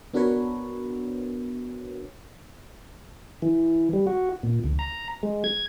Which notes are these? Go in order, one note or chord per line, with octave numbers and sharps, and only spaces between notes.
B3 D4 F#4 A#4 B4 C#5
E3
G3
F#4
A#2
D2
A#5
G#3
G#6